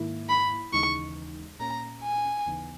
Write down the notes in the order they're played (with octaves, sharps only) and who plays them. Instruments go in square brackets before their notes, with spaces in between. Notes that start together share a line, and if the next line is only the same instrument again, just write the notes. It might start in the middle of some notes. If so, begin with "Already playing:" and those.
Already playing: [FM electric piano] G#2 D#3 A#3 E4
[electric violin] B5
[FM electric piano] D#2 C#3 E3 G#3 D#4 [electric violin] C#6
[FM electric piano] A#2 A#3 C#4 [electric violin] A#5
[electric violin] G#5
[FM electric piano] D#2 C#3 E3 B3 D#4